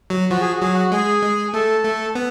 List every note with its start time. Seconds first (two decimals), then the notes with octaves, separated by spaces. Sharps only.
0.10 F#3
0.30 F3 F#4
0.41 G#4
0.52 F#4
0.62 F#3 G#4
0.74 F#4
0.92 G#3 G#4
1.23 G#3
1.53 A3 A4
1.84 A3
2.15 B3